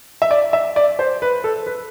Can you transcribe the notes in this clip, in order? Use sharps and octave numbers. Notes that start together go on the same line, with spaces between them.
E5
D5
E5
D5
C5
B4
A4
B4